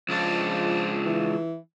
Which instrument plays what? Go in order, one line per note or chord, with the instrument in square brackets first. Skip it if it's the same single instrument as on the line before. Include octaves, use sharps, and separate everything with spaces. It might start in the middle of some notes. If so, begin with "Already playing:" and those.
[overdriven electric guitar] C#2 D4 [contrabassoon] F3
[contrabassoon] E3